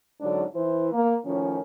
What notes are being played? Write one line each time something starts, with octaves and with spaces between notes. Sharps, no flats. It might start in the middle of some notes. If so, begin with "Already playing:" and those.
G#2 D3 F#3 C#4 D4
E3 E4 C5
A#3
A2 D#3 F3 C#4